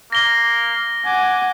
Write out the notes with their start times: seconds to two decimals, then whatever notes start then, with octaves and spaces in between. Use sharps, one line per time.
0.12 A#3 A#6 G7
1.05 F#5 G#5 D6